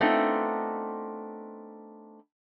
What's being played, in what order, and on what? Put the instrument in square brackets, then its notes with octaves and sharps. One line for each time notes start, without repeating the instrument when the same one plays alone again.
[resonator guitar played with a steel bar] A3 B3 C4 D4 D#4 F4